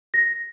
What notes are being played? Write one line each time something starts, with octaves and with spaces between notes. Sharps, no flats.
A#6